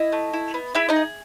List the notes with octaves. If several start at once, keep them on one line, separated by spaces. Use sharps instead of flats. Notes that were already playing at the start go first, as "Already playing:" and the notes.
Already playing: E4 D#5
A3
E4
B3
E4 G#4 E5
D#4 D#5
G#4